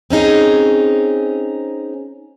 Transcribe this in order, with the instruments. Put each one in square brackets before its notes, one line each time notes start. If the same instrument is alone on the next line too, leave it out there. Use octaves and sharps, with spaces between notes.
[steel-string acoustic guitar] C4 C#4 D#4 G#4